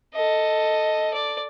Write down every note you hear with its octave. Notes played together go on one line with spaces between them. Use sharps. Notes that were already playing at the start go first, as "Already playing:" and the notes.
A4 D#5
D5